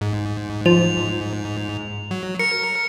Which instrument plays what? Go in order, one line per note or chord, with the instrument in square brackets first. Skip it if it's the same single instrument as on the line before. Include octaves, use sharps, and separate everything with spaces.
[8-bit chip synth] G#2
[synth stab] F3 [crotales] F7
[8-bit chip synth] F#3
[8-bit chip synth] A#4 [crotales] C#7